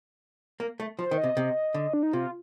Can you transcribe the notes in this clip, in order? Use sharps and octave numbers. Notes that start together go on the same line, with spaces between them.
A#3
A3
F3 C5
D#3
D#5
C3
C3
D3
D4
D#4
C3 F4